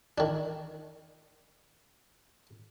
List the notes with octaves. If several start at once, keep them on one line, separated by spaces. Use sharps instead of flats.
D#3 D4